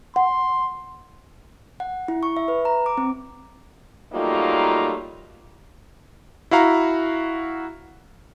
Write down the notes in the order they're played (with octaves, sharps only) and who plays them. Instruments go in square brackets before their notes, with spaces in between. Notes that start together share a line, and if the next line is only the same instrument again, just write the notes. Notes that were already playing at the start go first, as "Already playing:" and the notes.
[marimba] F#5 [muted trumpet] C6
[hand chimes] F#5
E4
C#6
E5
B4
A#5
D6
C4
[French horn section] F#3 G3 A3 A#3 D#4 F4
[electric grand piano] E4 F#4 F5 A#5